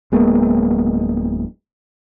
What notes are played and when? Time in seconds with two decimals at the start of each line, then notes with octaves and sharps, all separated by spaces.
0.12 D1 G#3 A#3 B3